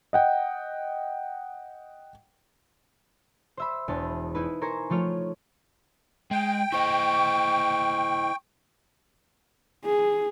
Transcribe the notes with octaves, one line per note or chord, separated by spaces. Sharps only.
D#5 F#5 G5
C5 E5 B5
E1 E2 A5
D#4 E4 B4
A#4 C5 G#5 C#6
F3 A3 F4 C#5 F6
G#3 G5
E4 C5 D#5 C#6
G#4